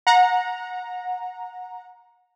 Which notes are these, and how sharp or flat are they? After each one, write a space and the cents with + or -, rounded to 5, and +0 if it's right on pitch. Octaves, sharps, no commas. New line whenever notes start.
F#5 -30 A#5 +0